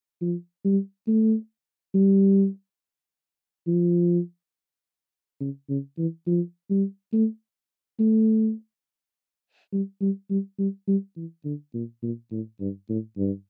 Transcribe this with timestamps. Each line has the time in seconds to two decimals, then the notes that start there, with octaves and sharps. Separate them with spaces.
0.21 F3
0.65 G3
1.08 A3
1.94 G3
3.67 F3
5.40 C#3
5.69 C#3
5.98 E3
6.27 F3
6.70 G3
7.13 A3
8.00 A3
9.72 G3
10.01 G3
10.30 G3
10.59 G3
10.87 G3
11.16 E3
11.45 D3
11.74 A#2
12.03 A#2
12.31 A2
12.60 G2
12.89 A2
13.18 G2